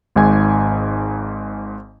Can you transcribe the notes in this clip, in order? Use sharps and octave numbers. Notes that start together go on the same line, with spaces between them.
G#1 G#2 G#5 G#6